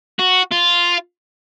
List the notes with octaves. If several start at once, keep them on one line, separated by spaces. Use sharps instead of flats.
F#4
F4